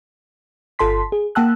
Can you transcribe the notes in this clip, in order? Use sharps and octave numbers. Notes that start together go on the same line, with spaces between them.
G1 F4 A4 A5 C6 B6
G#4
A#3 F#5 G5 A5 E6 F#6